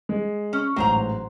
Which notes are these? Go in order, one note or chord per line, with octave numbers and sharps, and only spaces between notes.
G#3
C#4
A1 G#2 F#3 C5 A#5